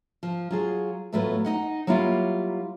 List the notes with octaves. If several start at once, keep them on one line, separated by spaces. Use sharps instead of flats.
F3
F#3 F4 G#4
E2 A2 F#3 A3 F4 B4
D#4 D#5 F#5
F#3 G3 A#3 E4 F4